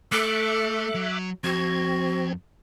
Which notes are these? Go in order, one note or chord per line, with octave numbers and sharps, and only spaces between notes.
A3 A4 E5 D6 F#6
F#3
F2 C4 F#4 G#6